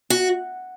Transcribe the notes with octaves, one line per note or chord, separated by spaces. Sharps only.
F#4